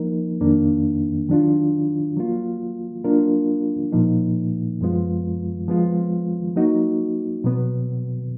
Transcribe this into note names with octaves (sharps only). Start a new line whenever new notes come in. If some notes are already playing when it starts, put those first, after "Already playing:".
Already playing: F3 A#3 D#4 A#4
F2 D#3 A#3 D4
D#3 F#3 D4 F4
F#3 A#3 F4
F#3 A#3 D4 F4 A#4
A#2 F3 A#3 D#4
F#2 F3 G#3 B3 F4
F3 G#3 B3 F4
F#3 A#3 D#4 F#4
B2 F#3 B3